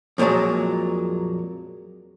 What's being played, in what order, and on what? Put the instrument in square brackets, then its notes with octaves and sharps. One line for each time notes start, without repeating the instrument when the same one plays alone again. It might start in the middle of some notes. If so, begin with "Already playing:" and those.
[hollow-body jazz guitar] F2 A#2 E3 F#3 G#3